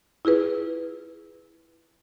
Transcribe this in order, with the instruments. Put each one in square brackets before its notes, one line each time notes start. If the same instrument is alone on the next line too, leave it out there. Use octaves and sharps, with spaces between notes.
[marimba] E4 F4 G#4 B4